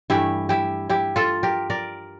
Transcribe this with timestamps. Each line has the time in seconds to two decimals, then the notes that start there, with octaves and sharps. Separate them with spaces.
0.10 G2 E3 A3 E4 G4
0.49 E4 G4
0.89 E4 G4
1.16 F4 A4
1.43 G4 A#4
1.70 A#4 D5